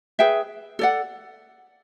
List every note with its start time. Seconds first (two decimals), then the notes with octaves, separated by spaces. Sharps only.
0.19 G#4 B4 E5 G5
0.79 A4 D5 F#5